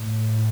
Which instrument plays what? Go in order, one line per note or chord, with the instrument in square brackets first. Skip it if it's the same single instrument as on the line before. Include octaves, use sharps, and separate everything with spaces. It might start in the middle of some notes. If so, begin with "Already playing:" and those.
Already playing: [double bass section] A2